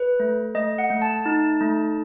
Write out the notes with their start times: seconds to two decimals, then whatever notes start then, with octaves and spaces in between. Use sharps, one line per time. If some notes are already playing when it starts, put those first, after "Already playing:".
Already playing: B4
0.20 A3
0.55 A3 D#5
0.78 F#5
0.90 A3
1.02 A5
1.26 D#4
1.61 A3